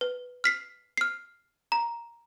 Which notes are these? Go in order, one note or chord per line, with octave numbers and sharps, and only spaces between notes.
B4
F6 B6 C7
F6 C7
A#5